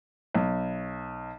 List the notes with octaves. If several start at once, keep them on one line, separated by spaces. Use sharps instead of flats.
B1